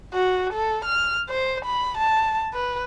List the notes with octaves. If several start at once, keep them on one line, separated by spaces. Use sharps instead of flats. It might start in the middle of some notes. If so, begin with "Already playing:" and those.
F#4
A4
F6
C5
B5
A5
B4